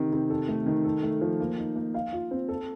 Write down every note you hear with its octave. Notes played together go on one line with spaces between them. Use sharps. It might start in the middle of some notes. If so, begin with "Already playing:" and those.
Already playing: C3 D#3
C3
A4
A3
D#3
A4
A3
F3
A#3
D#4
A#3
F5
F4
C4
A4